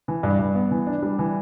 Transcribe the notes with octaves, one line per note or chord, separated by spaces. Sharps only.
E3
G2
G2
B3
E3
D4
G3
E3